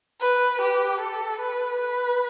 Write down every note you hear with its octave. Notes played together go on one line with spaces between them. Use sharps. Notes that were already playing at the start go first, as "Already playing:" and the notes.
B4
G4
A4
B4
B4